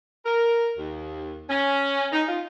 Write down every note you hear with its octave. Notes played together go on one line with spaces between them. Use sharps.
A#4
D#2
C#4
D#4
F4